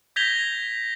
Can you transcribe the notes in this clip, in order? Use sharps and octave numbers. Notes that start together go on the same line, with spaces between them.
G6 G#6 A#6 B6 F7 G7